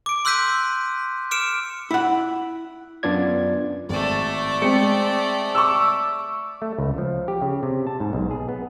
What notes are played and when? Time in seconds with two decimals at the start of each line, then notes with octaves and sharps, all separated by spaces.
0.06 D6 D7
0.25 C6 E6 F#6 G6 B6 D#7
1.31 D6 F6 C#7 D7 E7
1.91 E4 F#5
3.03 F#2 B3 D4 F4 D5 G#6
3.89 G#1 A3 D5
4.62 G#3 C4 C#7
5.55 C#6 D6 E6
6.62 A3
6.78 C#2
6.98 F3
7.28 G4
7.42 C#3
7.63 C3
7.87 A5
8.00 G#2
8.13 B1
8.31 G#4
8.49 B3